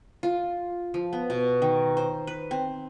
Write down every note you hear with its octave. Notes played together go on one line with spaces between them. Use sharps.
F4
F3
B3
B2
D#3
C5
B4
C4